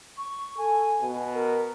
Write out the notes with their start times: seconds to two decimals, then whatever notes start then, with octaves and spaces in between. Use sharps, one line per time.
0.18 C#6
0.58 A4 G#5
1.02 B2
1.34 A#4